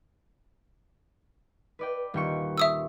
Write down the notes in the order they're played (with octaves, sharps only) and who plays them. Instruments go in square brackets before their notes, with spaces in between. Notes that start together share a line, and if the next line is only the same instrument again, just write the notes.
[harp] B4 D5 G5
D#1 G5 C#6
[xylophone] E5 D#6 E6